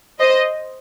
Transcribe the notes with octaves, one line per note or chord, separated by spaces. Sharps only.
C5 D#5